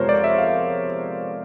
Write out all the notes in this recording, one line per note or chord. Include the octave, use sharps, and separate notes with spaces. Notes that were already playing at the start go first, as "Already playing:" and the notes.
Already playing: F2 C3 F3 G#3 B3 A#4 C5 C#5
D5
E5
F5